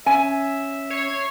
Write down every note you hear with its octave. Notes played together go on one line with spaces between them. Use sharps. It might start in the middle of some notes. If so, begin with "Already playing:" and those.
C#4 E5 G#5
C#5 G#6 C7